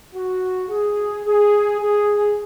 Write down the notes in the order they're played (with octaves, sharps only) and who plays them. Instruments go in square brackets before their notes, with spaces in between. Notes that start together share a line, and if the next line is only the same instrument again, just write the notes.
[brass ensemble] F#4
G#4
G#4
G#4